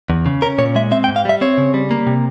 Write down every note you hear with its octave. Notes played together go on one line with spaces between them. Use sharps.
E2
C#3
C#4 A#4
A#2 C#5
G#3 E5
C4 E5
G5
G#2
F5
G3 E5
C4 C#5
C#3
G3
A#3
C3